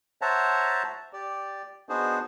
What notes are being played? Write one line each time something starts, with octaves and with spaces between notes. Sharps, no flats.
C5 C#5 E5 F#5 A5 A#5
G4 D5
B3 D4 D#4 F#4 G#4 C5